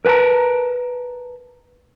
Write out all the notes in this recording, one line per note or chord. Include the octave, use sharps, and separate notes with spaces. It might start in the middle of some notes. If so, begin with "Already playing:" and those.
A#4 B4 G5 A5 A#5